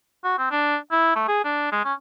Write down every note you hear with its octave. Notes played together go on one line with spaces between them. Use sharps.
F#4
C4
D4
E4
A3
G#4
D4
G#3
C#4